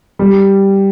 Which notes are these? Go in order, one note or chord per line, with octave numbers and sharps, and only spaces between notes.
G3